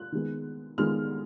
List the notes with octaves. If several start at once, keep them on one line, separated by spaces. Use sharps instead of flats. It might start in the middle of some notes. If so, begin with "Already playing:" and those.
Already playing: F#6
D#3 G#3 B3
D#3 G#3 B3 F6